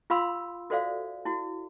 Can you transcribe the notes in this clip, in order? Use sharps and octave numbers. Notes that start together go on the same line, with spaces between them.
F4 G4 F5 B5 C6 E6
F#4 A4 C5 D5 E5 F5
E4 F#4